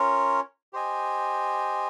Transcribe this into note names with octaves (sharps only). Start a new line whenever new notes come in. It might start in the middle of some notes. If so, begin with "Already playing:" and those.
Already playing: C#4 F4 A#4 C#5
G4 C5 D#5 G#5